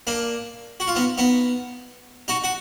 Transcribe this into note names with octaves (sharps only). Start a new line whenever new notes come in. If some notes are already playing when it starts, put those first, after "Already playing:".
A#3 D4
F#4
F4
B3 D#4
B3 D#4
D#4 F#4
F#4